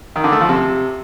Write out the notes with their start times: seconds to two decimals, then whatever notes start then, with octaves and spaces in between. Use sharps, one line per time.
0.16 D#3
0.24 D3
0.32 A3
0.41 F3
0.49 C3